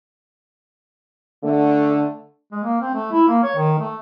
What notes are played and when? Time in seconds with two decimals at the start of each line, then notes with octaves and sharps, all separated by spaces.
1.44 D3 A3
2.52 G#3
2.63 A#3
2.81 C4
2.94 A3
3.12 E4
3.28 A#3
3.43 C#5
3.56 D#3
3.78 A3